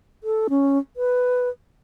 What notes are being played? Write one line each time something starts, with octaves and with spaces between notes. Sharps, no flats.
A4
C#4
B4